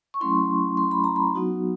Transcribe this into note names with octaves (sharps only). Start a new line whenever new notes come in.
C#6
F#3 A3 C#4 E4 C6
C6
B5
A#5
B5
F#3 B3 D#4 F#4